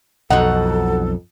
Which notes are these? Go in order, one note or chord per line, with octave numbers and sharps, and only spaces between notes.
B1 F2 D#4 F#4 A4 F#5